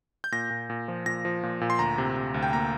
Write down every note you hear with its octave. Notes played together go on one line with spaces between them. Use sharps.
G6
A#2 A#6
A#2
A#2
F3
A#2 A#6
F3
A#2
A#2
C6
D2 A#5
C3
C3
D2
G5
A#3 A#5